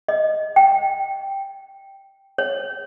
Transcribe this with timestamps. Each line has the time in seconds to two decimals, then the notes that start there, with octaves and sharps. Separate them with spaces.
0.08 D#5
0.56 G5
2.38 C#5